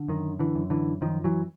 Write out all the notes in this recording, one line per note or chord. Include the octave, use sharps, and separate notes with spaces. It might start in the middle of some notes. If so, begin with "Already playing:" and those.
Already playing: D3
F#2 D#3
D3 E3
F#2
D3 E3
F#2 D#3 F3
E3 F#3